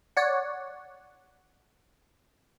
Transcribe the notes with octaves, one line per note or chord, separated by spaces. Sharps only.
C#5 D5 F#5